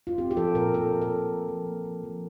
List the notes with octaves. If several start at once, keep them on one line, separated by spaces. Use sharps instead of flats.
F4
C4 G4
G4
F3 A4
A#2 A#4
A#2 A4
A#2
A4
A#2
F3
F3
A#3
F3
F3